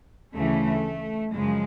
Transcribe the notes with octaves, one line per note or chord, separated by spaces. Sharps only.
D2 C#3 E3 A3
F#2 C#3 F3 G#3